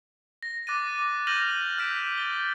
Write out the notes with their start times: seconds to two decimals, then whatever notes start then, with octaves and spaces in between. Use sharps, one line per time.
0.43 A#6
0.67 D6 F#6 A6 A#6 D#7
0.99 D6
1.27 F6 G6 A#6 D#7 F7 F#7
1.78 E6 F6 G6 B6 D7 E7
2.17 A6 G7